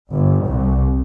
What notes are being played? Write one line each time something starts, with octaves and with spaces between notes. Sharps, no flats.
G1
C2